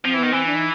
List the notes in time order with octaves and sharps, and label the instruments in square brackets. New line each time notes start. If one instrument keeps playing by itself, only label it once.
[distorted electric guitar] F3 [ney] C4
[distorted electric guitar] E3
[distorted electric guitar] D#3 [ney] B3
[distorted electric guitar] E3 [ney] C4
[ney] D4
D#4